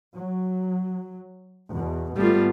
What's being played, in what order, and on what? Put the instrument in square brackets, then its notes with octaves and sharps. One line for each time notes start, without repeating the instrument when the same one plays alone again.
[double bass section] F#3
E2 B2
[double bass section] G#1 A3 B3 [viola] G3 F4